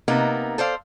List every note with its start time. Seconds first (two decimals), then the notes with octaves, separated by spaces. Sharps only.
0.08 C3 A#3 B3 D#4
0.58 A4 C5 D5 F5